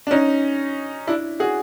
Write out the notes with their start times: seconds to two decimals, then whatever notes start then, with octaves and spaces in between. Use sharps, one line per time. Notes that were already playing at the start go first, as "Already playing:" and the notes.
0.07 D4
0.11 C#4 D#4
1.07 D4 E4
1.40 F#4 G#4